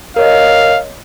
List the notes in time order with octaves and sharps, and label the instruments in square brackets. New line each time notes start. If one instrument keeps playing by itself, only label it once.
[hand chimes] A#4 C#5 D#5 [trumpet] F5